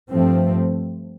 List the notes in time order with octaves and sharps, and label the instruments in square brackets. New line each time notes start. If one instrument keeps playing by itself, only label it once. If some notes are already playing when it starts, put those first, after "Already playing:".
[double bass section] G2 F3 A3 C4